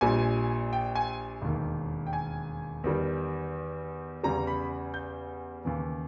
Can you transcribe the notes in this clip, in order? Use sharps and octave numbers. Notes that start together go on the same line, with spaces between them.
A#1 A#2 G3 G#5
G5
G#5
E1 D#2 D#3
G5
G#5
E2 D#3 G3
E2 C#3 G3 A#5
B5
G6
D#2 C#3 E3